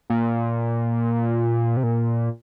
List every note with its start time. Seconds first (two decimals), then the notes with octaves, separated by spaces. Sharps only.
0.10 A#2
1.77 C3
1.83 A#2